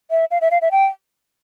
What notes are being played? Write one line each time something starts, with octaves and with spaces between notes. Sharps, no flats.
E5
F5
E5
F5
E5
G5